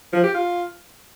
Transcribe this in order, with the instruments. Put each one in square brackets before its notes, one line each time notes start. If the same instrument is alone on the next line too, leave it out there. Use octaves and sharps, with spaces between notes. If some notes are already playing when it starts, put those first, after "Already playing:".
[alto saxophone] F3
G4
F4